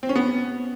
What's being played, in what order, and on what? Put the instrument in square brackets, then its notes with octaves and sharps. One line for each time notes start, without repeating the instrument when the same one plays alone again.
[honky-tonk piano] C4
C#4
B3